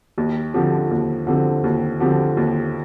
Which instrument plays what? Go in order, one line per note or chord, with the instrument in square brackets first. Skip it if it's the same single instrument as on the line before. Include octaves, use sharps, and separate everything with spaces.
[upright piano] D#2
D3 F3 C4 G4
D#2
D3 F3 C4 G4
D#2
D3 F3 C4 G4
D#2